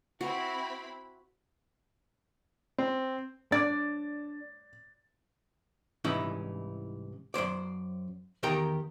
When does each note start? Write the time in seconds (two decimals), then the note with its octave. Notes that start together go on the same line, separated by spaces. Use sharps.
0.21 C4 E4 F#4 B5
2.78 C4
3.52 D4 D5 A6
6.04 C2 G#2 E3 C#4 D#4 E4
7.34 F#2 B2 C5 D5
8.43 E2 D#3 G4 A#4 G5 A#5